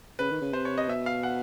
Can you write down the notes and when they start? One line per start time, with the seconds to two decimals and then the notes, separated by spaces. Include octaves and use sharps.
0.19 C#3 B4
0.31 D#3
0.42 C#3
0.53 C3 C5
0.65 C#5
0.78 D#5
0.88 B2 E5
1.06 F5
1.23 F#5